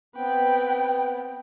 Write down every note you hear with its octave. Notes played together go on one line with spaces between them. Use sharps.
B3 C4 B4 G5